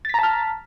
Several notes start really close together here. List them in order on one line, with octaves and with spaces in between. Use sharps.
A6 B6 A#5 A5 F6